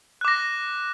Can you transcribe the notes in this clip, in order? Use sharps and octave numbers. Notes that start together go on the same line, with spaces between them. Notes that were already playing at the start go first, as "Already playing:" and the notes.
D6 F#6 A#6